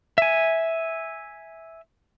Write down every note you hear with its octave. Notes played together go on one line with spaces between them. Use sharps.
E5 G#5